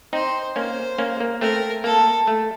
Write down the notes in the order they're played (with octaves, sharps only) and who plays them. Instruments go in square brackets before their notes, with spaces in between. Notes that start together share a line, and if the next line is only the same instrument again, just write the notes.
[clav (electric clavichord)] C4 D#4 [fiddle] C5
[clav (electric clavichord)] A#3 C#4 [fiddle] C5
[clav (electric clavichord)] A#3 C#4
A#3
[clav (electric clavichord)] A3 C4 [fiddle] A#4
[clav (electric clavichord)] A#3 [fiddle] A4
[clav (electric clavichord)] A3